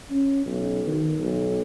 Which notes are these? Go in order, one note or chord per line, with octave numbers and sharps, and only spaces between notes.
C#4
B1
D#3
B1